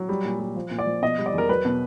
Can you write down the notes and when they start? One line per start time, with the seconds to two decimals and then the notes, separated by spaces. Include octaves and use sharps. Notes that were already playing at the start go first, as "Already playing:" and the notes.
Already playing: F#3
0.09 G3
0.25 A#2
0.40 G3
0.56 F3
0.71 A#2
0.79 D5
0.86 F3
1.02 B2 D#5
1.18 G3
1.26 D5
1.33 E2 A#4
1.49 F#3 B4
1.65 B2